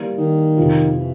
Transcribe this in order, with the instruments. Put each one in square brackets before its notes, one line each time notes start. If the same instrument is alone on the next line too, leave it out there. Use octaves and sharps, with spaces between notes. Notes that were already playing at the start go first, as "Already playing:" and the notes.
Already playing: [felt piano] E3 G3 A#3
[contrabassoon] D#3
[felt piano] F2 C3 F3
[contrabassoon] E3